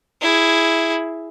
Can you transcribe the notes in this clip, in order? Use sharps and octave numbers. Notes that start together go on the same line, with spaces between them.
E4 G#4